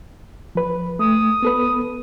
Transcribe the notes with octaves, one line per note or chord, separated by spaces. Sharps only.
F3 B4
A3 D#6
B3 A4 B4